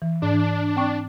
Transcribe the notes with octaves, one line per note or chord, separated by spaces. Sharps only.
E3
G#2 D4
E3
C4 G5 C#6